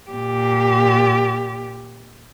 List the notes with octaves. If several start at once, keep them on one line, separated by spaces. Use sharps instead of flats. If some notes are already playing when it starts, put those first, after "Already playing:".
A#2 G4